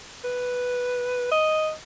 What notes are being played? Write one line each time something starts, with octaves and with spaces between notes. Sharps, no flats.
B4
D#5